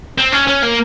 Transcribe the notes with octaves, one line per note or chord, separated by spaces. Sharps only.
C4
C#4
C#4
A#3